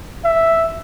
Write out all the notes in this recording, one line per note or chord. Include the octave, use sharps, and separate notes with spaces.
E5